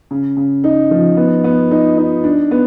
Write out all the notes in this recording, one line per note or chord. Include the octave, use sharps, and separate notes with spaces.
C#3
C#3
D#4
F3
B3
B3
D#4
D#4
D4
B3